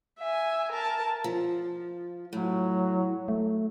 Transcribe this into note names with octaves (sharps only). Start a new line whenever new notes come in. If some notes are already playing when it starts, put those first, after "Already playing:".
E5 G#5
A#4 A5
F3
A2 F#3
A3